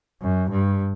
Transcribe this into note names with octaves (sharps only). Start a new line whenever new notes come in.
F#2
G2